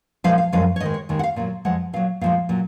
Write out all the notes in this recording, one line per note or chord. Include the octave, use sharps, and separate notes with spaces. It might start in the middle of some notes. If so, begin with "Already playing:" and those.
A#2 F3 G#3 F5
F5
F#2 F3 G#3 F5
C#5
G#2 D#3 G#3 D#5
C#5
D#2 D#3 G#3
F#5
F5
A#2 F#3 F5
F2 F3 G#3 F#5
A#2 F#3 F5
A#2 F3 G#3 F5
A#2 F#3